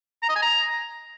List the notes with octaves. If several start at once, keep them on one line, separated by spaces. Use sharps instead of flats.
A#5
D#5
G#5
A#5